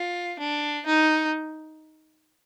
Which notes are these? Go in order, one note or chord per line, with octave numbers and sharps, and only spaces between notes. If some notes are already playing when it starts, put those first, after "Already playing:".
Already playing: F4
D4
D#4